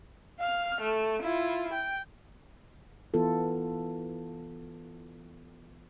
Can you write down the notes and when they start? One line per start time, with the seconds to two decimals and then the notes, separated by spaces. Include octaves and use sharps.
0.39 F5 F6
0.81 A3
1.22 E4 F4
1.73 G5
3.14 E3 B3 F4 A4